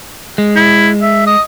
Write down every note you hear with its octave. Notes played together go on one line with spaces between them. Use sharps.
G#3
E4
E5
D#5